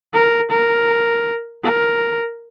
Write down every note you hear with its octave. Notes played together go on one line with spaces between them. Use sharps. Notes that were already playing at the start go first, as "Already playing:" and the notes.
A#4
A#4
A#4